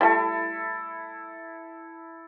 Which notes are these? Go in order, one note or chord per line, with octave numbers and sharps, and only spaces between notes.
G3 A3 E4 A4